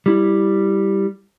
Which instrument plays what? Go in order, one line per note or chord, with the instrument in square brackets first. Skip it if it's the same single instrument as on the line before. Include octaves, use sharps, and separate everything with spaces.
[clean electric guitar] G3 E4 B5